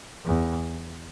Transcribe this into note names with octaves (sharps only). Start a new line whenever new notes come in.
E2